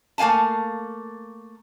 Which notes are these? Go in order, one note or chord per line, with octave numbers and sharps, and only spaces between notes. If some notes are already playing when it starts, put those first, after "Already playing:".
A3 A#3 F5 G#5 A5